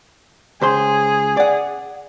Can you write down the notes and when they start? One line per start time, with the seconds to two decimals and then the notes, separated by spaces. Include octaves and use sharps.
0.61 C#2 G#4 C5 C6
1.37 D5 F#5